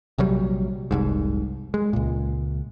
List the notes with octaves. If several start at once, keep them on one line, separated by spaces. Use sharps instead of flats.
A#1 C3 F#3 G3
F1 C2 G#2
G#3
C#2 A#2